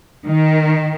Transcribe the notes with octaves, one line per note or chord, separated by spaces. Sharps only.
D#3